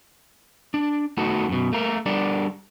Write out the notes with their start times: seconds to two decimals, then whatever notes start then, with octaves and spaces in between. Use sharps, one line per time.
0.74 D4
1.17 A3 B3 D#4 F#4 A4
1.49 F#2 B2
1.73 A3 A#3 A#4
2.06 G3 D4 A4 A#4 D5